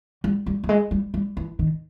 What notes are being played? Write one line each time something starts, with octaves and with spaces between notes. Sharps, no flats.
G3
G3
G3
G#3
G3
G3
E3
D#3